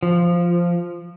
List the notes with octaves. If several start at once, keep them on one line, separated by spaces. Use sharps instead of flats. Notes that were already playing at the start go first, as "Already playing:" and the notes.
F3